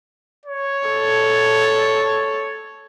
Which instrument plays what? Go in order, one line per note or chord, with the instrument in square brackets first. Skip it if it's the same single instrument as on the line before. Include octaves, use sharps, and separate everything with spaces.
[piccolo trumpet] C#5
[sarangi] A4